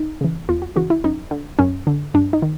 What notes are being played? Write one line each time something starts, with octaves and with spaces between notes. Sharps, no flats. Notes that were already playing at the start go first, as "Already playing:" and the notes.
Already playing: D#4
C#3 E3
E2 F4
F#4
C#3 E3 F#4
E4
F#2 D#4
D3
F#2 C#4
D3
G2 D4
D#4
D#3